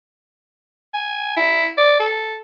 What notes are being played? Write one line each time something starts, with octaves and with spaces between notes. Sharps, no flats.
G#5
E4
D5
A4